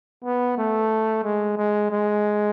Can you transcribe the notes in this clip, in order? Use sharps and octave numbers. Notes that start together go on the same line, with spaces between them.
B3
A3
G#3
G#3
G#3